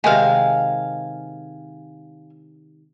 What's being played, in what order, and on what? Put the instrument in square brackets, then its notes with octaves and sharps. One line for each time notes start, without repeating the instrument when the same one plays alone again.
[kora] C3 D#3 G#3 [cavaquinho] F5 G#5